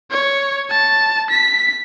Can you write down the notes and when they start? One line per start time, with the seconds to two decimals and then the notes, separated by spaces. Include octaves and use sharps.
0.11 C#5
0.71 A5
1.30 B6